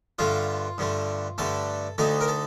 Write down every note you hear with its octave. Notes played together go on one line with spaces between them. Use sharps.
G2 D3 A3 F4
G2 D3 A3
G2 D3 A3 A4
D2 D3 A3 D#4 A4
A#4
A4